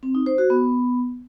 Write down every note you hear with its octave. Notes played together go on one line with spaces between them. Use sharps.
C4
D#4
C5
F#4
B3